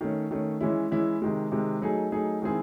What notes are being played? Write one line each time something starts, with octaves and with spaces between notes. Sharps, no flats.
D#3 A3 C#4
D#3 A3 C#4
E3 G#3 C#4 E4
E3 G#3 C#4 E4
C3 D#3 G#3
C3 D#3 G#3
F#3 A3 D#4 G#4
F#3 A3 D#4 G#4
D#3 G#3 C4 E4 G#4